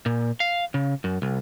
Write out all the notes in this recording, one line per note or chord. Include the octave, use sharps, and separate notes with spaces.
A#2
F5
C#3
F#2
C2